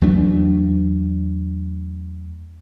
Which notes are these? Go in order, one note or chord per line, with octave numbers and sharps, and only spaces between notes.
E2 F#3 A3 D4